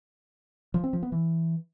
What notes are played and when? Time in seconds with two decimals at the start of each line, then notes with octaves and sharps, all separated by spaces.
0.74 F3
0.84 C4
0.93 F3
1.03 B3
1.12 E3